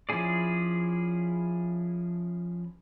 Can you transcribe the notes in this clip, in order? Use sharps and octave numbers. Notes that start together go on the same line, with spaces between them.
F3 C#4 E4 G#4 D5